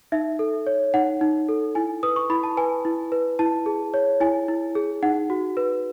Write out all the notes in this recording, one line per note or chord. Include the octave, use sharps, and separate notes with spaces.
D#4 E5
A4
C#5
D#4 F#5
D#4
A4
E4 G#5
B4 D#6
C#6
E4 B5
A5
B4 G#5
E4
B4
E4 A5
G#4
C#5
E4 G#5
E4
G#4
D#4 F#5
F#4
B4